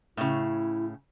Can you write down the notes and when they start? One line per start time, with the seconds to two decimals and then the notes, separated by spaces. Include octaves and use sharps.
0.17 A2 C#3 E4